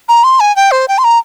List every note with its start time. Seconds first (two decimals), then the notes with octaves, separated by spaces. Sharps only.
0.08 A#5
0.24 C6
0.40 G#5
0.56 G5
0.71 C5
0.88 G5
0.98 C6
1.04 A#5